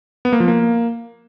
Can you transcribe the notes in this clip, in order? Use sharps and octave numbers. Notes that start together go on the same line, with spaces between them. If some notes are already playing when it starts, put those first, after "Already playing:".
B3
A#3
F3
A#3